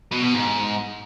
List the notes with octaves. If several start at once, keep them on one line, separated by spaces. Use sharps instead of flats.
B2
B2
G#2